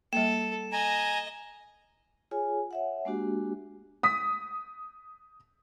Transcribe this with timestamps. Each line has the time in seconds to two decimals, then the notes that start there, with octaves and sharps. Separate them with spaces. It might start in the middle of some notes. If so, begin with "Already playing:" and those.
0.13 G3 A#3 A4 E7
0.72 D#5 G#5 A#5
2.31 F4 G#4 C#5 G#5
2.71 C#5 E5 F#5
3.05 G#3 A#3 D4 F#4 G4
4.03 D#6 B6